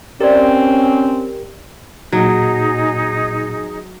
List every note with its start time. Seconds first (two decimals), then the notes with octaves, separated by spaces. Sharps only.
0.21 C4 C#4 G4 A#4 D5 D#5
2.12 A#2 F#3 D#4 G#4